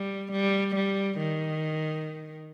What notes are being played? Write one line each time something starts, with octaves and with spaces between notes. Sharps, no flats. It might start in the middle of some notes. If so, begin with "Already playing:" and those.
Already playing: G3
G3
G3
D#3